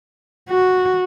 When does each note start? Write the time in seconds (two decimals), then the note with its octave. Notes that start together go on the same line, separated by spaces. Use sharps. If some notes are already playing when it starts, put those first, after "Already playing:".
0.49 F#4